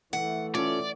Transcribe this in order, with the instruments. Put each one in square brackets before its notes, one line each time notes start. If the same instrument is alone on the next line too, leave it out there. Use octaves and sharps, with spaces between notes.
[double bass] E3 A3 [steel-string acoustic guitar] F#5
[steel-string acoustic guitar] C#4 [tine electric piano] F4 A4 [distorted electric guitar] D5